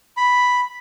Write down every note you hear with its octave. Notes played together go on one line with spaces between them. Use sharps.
B5